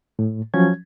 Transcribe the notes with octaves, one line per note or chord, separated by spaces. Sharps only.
A2
F3 F#3 C#4 G#6